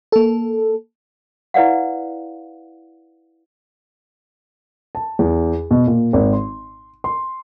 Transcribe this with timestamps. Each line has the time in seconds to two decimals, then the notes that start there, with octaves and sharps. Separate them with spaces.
0.12 A#3 A4
1.54 E4 B4 D5 F5 F#5
4.95 A5
5.19 E2
5.71 B2
5.87 A#2
6.13 G#1
6.33 C6
7.04 C6